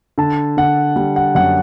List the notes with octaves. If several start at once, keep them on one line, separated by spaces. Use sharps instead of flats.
D3 A5
D3 F#5
G3
F#5
F#2 F#5